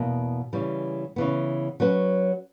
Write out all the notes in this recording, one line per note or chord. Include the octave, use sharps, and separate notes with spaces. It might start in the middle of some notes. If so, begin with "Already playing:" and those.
Already playing: E2 B2 A#3
C#3 E3 G3
C#3 E3 B3
F#3 C#4 F#4 B4